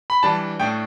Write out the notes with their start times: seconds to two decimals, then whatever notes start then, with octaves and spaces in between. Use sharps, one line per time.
0.10 B5
0.23 E3 G3 D4 A5
0.60 A2 A3 D4 G5